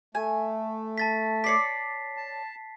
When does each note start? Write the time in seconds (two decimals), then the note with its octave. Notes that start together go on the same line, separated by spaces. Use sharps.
0.15 A3 G#5
0.98 A5 A6 B6
1.44 C#5 D5 D6 B6 C7
2.17 A5